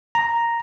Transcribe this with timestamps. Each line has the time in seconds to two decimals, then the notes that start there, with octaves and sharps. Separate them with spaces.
0.15 A#5